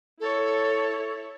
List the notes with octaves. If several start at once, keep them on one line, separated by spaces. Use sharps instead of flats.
E4 A4 C#5